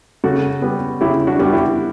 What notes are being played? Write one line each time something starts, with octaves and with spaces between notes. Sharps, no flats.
C#3 F#4 A4
G3 B3
C#3 E4 G4
D4 F#4
G3 B3
F#4
E4 G4